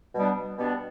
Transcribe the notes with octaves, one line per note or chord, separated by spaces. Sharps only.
B2 G3 B3 D4
B2 G3 B3 D4